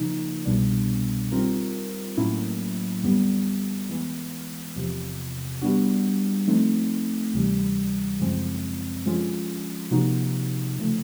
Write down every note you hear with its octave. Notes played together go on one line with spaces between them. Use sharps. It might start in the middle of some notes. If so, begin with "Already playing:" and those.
Already playing: C#3 F3 A#3 D#4
C2 B2 G3 B3 D4
D#3 G3 C4 F4 A#4
A2 F#3 A#3 C#4 E4
F2 D3 G3 B3
E3 G#3 B3
E2 C3 F3
G3 B3 D4 F#4
F3 A3 C4 D#4
D2 C3 E3 G3
F#2 C#3 F3 G#3 C4
D3 F3 G#3 C#4 F4
C3 F3 A#3 D#4 F#4
C#3 F3 A3